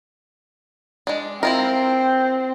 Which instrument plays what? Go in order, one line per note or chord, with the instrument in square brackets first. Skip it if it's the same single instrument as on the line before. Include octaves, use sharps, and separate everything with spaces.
[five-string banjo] G#3 D4
[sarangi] C4 [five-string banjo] E4 F4 A#4